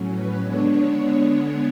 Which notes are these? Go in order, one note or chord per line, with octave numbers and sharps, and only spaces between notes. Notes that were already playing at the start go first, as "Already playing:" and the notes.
Already playing: A2 F#3 C#4
B4
D3 G#3 B3 D4 C#5